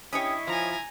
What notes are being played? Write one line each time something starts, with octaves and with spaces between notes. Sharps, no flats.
C#4 E4 G4 C#5 D#5 D#6
F3 G#5 A#5